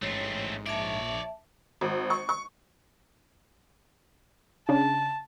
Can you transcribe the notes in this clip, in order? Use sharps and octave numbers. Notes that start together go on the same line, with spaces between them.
A1 G#2 A3 C4 C#5
A#1 C#5 D5 E5 A5
G#1
C#6
C#6
C#3 D4 A5